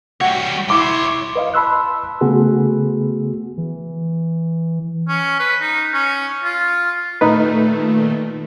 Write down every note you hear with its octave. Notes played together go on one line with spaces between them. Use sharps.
G3 F#4 C#5 E5 G5
E4 C#5 C6 D6
B4 D#5 F5
A5 B5 C6 E6 F#6
C#3 A3 B3 F#4 G#4
E3
C#4
B4
D#4
C#4
F4
A#2 D#3 A3 D#4 B4